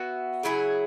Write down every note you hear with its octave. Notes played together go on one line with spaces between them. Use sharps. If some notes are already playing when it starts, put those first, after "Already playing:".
Already playing: B3 F#4 E5
C#3 F#3 E4 G#4